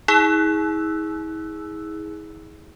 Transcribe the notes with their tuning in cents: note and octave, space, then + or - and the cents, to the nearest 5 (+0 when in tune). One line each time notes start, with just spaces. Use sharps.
E4 -45 G#4 +0 E6 +0